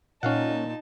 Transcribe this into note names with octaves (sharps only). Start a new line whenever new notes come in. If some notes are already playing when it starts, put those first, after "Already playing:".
A#2 C#4 D#4 F5 F#5 A5